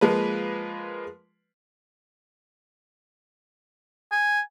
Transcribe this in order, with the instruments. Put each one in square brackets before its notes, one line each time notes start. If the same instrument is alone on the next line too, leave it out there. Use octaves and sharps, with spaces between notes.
[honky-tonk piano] F3 G#3 A#3 B4
[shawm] G#5